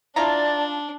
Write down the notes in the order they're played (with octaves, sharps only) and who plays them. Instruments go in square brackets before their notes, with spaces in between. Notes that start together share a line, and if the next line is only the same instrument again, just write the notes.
[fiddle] D4 [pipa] E4 F4 A#5 [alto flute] D5 [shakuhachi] A5